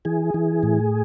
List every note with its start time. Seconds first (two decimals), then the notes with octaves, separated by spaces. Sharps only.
0.05 E3 G#4
0.34 E3
0.63 A2